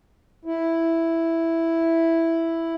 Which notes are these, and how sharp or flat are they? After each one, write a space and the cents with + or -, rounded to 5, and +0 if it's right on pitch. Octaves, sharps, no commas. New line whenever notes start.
E4 +0